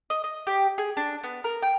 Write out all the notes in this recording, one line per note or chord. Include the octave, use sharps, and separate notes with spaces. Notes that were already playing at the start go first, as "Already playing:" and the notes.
D#5
D#5
G4
G#4
D4
B3
A#4
G5